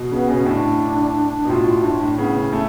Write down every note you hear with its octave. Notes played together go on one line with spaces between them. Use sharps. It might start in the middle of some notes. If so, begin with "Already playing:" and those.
Already playing: B2
C#3 B3
B2 C#4
A2 D4
B2
A2 F4
A2 D4
A2
C#3 B3
C#4
A3 C#4